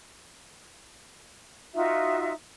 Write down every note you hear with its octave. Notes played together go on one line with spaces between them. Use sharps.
D#4 F4 F#4 E5